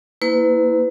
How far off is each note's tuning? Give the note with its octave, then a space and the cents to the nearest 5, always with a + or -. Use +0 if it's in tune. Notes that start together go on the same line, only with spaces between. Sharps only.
A#3 +0 E4 -15 B4 +35